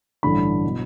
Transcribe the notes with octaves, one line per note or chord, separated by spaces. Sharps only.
A1 G2 D3 A3 D4 B5
B2 F#3